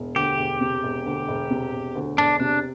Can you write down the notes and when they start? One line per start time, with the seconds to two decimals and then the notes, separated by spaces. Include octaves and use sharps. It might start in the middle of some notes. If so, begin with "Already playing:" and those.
Already playing: E1
0.15 D2 G4
0.38 E1
0.61 C3
0.83 E1
1.06 D2
1.28 E1
1.50 C3
1.73 E1
1.95 D2
2.18 E1 D4
2.40 C3 D4